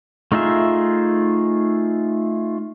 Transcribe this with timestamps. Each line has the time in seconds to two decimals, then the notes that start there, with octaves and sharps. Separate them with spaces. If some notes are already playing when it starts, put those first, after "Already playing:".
0.32 A3 D#4 F4 G#4 E5